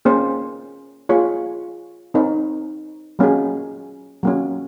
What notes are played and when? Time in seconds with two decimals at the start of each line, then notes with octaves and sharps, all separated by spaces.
0.05 A#3 C#4 G#4 C5
1.09 A#3 F4 G#4 C#5
2.14 C4 D#4 A#4 C#5
3.19 F#3 A#3 C#4 G#4
4.23 F#3 A#3 C#4